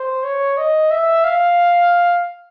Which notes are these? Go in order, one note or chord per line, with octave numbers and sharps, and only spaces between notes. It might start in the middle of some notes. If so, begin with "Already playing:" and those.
Already playing: C5
C#5
D#5
E5
F5